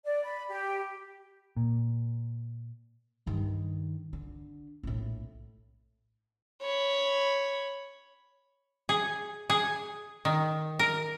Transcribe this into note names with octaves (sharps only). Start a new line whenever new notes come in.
D5
B5
G4
A#2
G2 D#3
D3
A#1 A2
C#5 B5
G#4
G#4
D#3
A#4